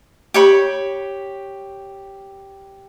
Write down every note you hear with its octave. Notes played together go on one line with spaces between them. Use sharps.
G4 C#5 B5